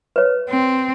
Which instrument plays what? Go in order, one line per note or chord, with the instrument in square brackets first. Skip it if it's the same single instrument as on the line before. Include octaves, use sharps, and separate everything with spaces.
[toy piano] B4 C#5
[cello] C4